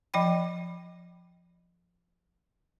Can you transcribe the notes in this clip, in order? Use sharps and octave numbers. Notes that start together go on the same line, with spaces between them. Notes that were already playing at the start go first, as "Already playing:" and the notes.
F3 D#5 G5 B5